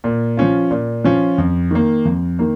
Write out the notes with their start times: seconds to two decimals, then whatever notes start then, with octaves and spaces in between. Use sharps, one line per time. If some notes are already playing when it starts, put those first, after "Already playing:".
0.04 A#2
0.37 F3 C#4 F4
0.71 A#2
1.04 F3 C#4 F4
1.38 F2
1.71 D#3 A#3
2.05 F2
2.39 D#3 A#3